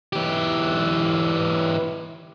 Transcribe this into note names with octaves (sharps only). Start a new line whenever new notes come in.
E3 G4